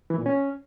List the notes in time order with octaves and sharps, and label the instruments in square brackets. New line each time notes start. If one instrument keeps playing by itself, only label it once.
[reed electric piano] E3
A#2
C#4